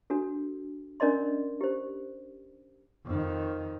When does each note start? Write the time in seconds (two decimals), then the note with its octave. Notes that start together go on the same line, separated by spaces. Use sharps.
0.10 D4 F#4 A4
1.00 C#4 D4 A#4 D5 D#5 C6
1.61 G4 C5
3.05 F2 D#3